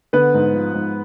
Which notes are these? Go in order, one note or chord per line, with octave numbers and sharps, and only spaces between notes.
D3 B3 B4
G#2
F3
G#2